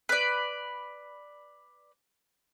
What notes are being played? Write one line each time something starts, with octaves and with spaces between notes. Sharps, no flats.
B4 D5